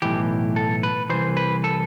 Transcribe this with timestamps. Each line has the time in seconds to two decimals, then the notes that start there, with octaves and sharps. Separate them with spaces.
0.02 B1 A2 E3 G4
0.56 A4
0.83 B4
1.10 C2 C3 E3 C5
1.37 B4
1.64 A4